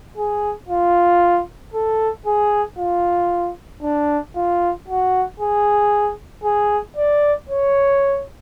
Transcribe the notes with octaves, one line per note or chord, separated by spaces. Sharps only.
G#4
F4
A4
G#4
F4
D4
F4
F#4
G#4
G#4
D5
C#5